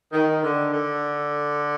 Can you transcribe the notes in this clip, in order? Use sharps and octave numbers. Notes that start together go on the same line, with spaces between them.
D#3
D3
D3